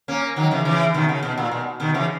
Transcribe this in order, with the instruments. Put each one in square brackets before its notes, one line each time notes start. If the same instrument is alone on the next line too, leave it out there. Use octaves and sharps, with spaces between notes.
[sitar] A#3 C#4
D#3 F#3
C#3 E3
C#3 E3
B2 D#3
C#3
B2
A#2
B2
B2 D#3
C#3 E3